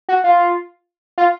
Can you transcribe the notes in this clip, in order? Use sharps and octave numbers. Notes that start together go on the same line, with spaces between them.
F#4
F4
F4